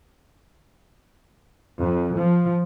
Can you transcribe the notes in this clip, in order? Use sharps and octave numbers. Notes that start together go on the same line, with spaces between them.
F2
F3